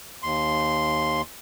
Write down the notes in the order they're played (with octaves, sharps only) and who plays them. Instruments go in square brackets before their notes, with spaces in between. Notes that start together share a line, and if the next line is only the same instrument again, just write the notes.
[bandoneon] D#2 C6